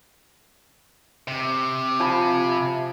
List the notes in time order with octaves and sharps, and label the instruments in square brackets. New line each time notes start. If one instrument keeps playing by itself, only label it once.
[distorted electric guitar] C3
[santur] F3 G#5 B5